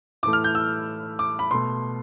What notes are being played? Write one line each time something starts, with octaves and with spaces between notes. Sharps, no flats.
A2 E3 A3 D6
F6
G6
E6
D6
B5
B2 A3 C6